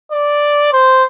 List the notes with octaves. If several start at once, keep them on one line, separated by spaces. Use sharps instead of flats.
D5
C5